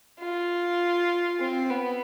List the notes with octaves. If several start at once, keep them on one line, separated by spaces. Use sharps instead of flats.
F4
C4
B3